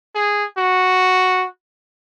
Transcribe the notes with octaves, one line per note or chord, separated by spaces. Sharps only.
G#4
F#4